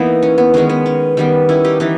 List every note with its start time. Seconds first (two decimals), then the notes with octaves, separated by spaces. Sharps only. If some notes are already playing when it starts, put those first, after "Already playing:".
Already playing: E3 A#3 B3 D#4
0.23 C#4
0.38 B3
0.54 D#3 G#3 B3 C#4
0.70 B3
0.86 C#4
1.17 D#3 G3 B3
1.49 C#4 E4
1.64 D#4 G4
1.80 E3 D#4 G4